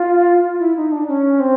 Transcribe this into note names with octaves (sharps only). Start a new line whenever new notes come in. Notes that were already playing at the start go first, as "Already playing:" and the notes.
Already playing: F4
F4
E4
D#4
D4
C#4
C4